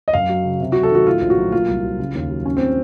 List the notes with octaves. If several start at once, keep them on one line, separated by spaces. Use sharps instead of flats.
D#5
F#2 F5
F#3
C#3
C3
F#3 F#4
A4
D#3 F#4
A2 F4
A#1
F#4
F#3
A#2 F4
C2
F#3
C#3
D#2
F#3
A2 C#4
C4